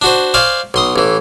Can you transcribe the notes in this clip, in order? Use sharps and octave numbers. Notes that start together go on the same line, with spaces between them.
D4 F#4 C5
C5 D5 F5 G#5 C#6
B1 C6 D#6
A1 E3